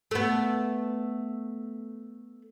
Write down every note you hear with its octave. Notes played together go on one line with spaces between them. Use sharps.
A3 B3